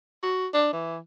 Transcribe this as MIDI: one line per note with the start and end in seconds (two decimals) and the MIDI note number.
0.23 0.47 66
0.54 0.72 62
0.73 0.98 52